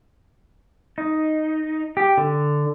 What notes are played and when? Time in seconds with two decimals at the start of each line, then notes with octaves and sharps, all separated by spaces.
0.98 D#4
1.97 G4
2.18 D3